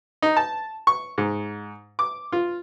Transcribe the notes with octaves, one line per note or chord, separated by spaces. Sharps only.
D#4
A5
C#6
G#2
D6
F4